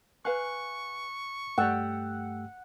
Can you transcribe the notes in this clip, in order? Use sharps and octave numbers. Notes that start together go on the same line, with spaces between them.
B4 F5 G#5 C#6 F#6
G2 A3 G4 D5 F#5 G5 E6